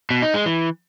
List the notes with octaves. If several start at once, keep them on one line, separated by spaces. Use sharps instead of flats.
B2
D#4
G#3
E3